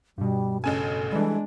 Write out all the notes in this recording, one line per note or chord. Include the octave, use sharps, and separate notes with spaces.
G2 B2 G3
A1 C#3 A4 G#5
E3 G3 G#3 D4